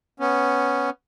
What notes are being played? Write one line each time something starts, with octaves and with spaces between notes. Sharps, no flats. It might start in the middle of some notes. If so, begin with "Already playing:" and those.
B3 C#4